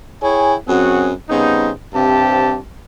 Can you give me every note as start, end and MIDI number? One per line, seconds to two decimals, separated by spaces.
0.22 0.54 64
0.22 0.54 68
0.22 0.54 73
0.22 0.54 79
0.22 0.54 80
0.67 1.12 42
0.67 1.12 54
0.67 1.12 60
0.67 1.12 66
0.67 1.12 68
0.67 1.12 78
1.29 1.71 49
1.29 1.71 55
1.29 1.71 59
1.29 1.71 60
1.29 1.71 63
1.94 2.57 43
1.94 2.57 48
1.94 2.57 60
1.94 2.57 67
1.94 2.57 81